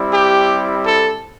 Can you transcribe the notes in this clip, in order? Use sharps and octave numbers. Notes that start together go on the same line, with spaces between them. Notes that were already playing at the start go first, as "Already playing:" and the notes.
Already playing: G3 C4 E4
G4
A4